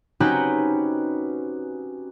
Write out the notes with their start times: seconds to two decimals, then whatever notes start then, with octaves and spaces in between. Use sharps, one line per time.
0.20 C4 C#4 D#4 F#4 G4 B4